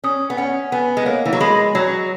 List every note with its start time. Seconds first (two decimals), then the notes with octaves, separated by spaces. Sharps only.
0.04 C#4 D#6
0.30 B3
0.37 C#4 F#5
0.72 B3 G#5
0.97 G#3
1.06 A#3 C#5
1.26 E3
1.33 F#3
1.40 G#3 B5
1.75 F#3 C#5